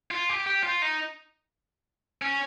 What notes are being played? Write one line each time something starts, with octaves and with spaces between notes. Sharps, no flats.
F4
G4
G4
F4
D#4
C#4